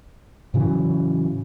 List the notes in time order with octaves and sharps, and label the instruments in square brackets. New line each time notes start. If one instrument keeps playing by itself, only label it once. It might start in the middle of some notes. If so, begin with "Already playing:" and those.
[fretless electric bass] A2 C#3 E3 F#3